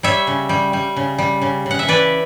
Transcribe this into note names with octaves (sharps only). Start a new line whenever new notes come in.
G3 C#5 E5
C#3
G3
G3
C#3
G3
C#3
C#3 F#5
E5
E3 B4 D5